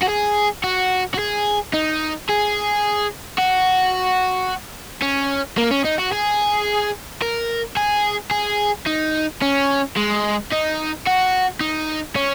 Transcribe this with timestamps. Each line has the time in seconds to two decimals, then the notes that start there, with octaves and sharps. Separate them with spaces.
0.03 F#4
0.09 G#4
0.64 F#4
1.14 F#4
1.19 G#4
1.73 D#4
2.29 G#4
3.38 F#4
5.02 C#4
5.58 A#3
5.71 C#4
5.85 D#4
5.99 F#4
6.13 G#4
7.22 A#4
7.77 G#4
8.31 G#4
8.87 D#4
9.42 C#4
9.96 G#3
10.52 D#4
11.06 F#4
11.61 D#4
12.16 C#4